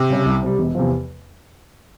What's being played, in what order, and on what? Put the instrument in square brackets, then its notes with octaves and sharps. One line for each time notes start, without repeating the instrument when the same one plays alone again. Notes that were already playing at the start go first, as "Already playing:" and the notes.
Already playing: [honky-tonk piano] C3
[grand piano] C#3 G3 C#4
C2
C3 G3
E1
E2 C3 F3